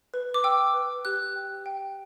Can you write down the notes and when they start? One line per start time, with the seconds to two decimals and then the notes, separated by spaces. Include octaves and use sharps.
0.14 B4
0.34 D6
0.44 G5 E6
0.74 B4
1.05 G4 F#6
1.36 G5
1.66 G5